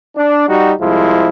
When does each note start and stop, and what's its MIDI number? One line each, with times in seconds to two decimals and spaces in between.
0.16 0.44 62
0.48 0.72 55
0.48 0.72 63
0.48 0.72 66
0.79 1.29 36
0.79 1.29 53
0.79 1.29 56
0.79 1.29 64